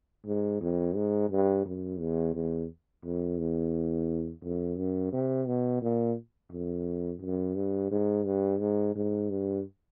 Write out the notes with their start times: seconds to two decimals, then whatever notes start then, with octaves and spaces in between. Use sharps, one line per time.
0.26 G#2
0.61 F2
0.95 G#2
1.30 G2
1.65 F#2
2.00 E2
2.35 E2
3.04 F2
3.38 E2
4.43 F2
4.77 F#2
5.13 C3
5.47 B2
5.82 A#2
6.51 F2
7.21 F#2
7.56 G2
7.91 G#2
8.25 G2
8.60 G#2
8.95 G#2
9.30 G2